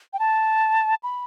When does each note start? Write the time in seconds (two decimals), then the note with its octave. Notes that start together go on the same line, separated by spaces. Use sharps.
0.13 G5
0.19 A5
1.03 B5